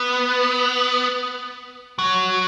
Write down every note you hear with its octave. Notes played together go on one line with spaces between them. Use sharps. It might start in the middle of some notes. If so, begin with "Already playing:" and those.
Already playing: B3
F#3